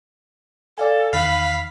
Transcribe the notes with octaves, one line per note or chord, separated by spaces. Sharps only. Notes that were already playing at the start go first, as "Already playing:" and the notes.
A4 D5 F5 G#5
E2 D#3 F5 B5 B6